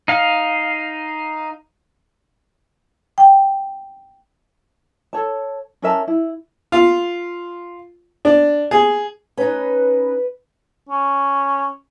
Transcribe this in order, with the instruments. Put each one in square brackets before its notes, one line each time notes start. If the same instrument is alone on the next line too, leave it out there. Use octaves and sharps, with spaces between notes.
[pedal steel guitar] D#4 F5
[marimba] G5
[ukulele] A4 C#5 A5
C#4 A#4 E5 A5
E4
[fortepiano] F4
D4
G#4
[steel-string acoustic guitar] C#4 D#4 [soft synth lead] B4
[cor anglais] C#4